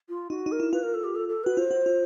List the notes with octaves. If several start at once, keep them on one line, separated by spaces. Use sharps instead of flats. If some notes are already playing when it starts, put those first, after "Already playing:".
F4
D#4 F#4
D#4
A#4
E4
F4 B4
A#4
A4
G4
A4
A4
F#4 B4
F4 C5
F#4
F4